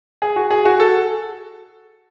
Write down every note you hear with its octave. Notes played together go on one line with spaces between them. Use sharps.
G#4
F#4
G#4
F#4
A4